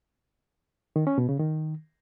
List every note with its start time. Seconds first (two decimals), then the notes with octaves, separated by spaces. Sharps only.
0.96 D#3
1.07 C#4
1.18 B2
1.29 C#3
1.40 D#3